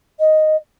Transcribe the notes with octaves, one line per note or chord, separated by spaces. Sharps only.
D#5